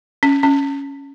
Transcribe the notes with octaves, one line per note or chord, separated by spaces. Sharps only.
C#4
C#4